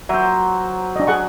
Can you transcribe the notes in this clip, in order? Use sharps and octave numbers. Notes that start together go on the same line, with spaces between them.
F#3 C5 E5
D4 D#5
G#4 F#5 C#6